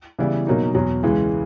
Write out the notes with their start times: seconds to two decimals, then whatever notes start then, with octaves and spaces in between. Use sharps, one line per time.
0.19 C#3 E3 G3 B3 E4
0.47 B2 F#3 A#3 D#4
0.74 E2 B2 F#3
1.03 C#2 C#3 E3 G#3